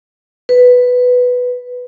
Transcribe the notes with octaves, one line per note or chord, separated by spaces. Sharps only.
B4